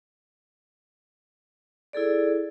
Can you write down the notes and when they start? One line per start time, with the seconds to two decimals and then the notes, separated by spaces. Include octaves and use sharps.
1.93 E4 G#4 A4 D5